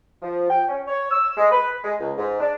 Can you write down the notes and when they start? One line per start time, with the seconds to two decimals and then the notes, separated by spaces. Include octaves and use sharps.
0.22 F3
0.50 G5
0.68 C#4
0.87 C#5
1.11 E6
1.37 G#3
1.51 B4
1.84 G#3
2.00 C#2
2.17 G#2
2.40 D4